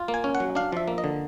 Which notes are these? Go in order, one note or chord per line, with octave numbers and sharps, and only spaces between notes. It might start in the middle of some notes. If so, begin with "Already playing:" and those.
Already playing: F4
A#3
G#5
C#4
F#5
F#3
D4 F5
F3 E5
A#3
D#5
D3